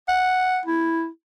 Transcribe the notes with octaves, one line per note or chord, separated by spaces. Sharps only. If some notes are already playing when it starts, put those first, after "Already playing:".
F#5
E4